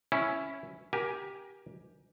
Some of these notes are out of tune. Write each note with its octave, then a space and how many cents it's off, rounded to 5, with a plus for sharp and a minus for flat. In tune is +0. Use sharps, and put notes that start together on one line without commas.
C#4 +0 E4 +0
G4 +0 A#4 +25 G#5 +5